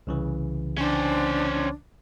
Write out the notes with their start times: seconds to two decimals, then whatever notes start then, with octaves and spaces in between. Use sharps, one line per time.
0.07 C2 C#3 E3
0.78 C#4 D4 C5